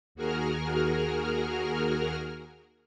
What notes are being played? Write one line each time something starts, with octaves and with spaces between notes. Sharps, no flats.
D#2 F#4 G#4 A#4 F6